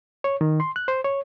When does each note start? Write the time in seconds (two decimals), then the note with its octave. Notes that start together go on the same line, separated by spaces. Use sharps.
0.24 C#5
0.41 D#3
0.60 C6
0.76 F#6
0.88 C5
1.04 C#5